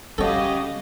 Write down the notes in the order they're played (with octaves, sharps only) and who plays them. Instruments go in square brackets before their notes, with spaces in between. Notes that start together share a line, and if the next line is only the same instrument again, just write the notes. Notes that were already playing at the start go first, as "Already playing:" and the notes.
[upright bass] G3 [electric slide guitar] C#4 F5 [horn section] F#4 G4 D#5 [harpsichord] A4 C#5